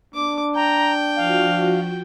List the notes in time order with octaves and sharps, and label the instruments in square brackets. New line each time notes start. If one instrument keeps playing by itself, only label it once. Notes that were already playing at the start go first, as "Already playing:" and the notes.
[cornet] D4 [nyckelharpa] D6
[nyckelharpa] G5 [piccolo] A#5
[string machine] F3 F#4 [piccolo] F5